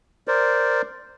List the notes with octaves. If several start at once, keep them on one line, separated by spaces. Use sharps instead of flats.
A#4 C5 D5